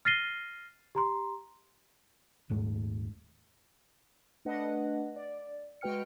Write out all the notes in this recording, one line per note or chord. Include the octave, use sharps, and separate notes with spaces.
F6 A6 A#6 C7 D#7 G7
G4 A#5 C6
D#1 G#2 A3
A3 D4 B4 D#5 F#5
D5
G#3 F#4 B4 G5 F6 C#7